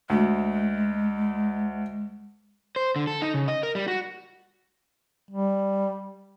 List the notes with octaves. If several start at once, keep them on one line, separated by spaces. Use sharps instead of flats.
D2 G#3
C5
D3
A4
D#4
C#3
D#5
A#4
G3
F#4
G3